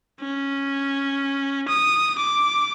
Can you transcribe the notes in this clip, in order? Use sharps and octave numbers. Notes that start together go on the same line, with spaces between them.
C#4
D#6
D6